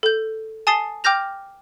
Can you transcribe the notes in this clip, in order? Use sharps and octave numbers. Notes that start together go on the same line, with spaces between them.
A4 G6
G#5 A5 D#6 A6 C7 G7
G5 D6 F6 G6 A#6 F7